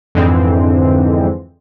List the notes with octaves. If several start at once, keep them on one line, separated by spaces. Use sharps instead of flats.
F2 G#2 D3 E3 G#3 C4